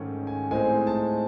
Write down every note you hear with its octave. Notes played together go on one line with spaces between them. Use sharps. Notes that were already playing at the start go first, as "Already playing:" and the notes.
Already playing: G#2 D#3 A3 C#4
G#5
A2 G#3 C4 D#4 G#5
A5